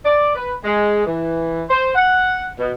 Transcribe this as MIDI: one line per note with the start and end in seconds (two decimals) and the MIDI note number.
0.05 0.31 74
0.36 0.53 71
0.65 1.04 56
1.06 1.63 52
1.69 1.90 72
1.95 2.51 78
2.59 2.72 47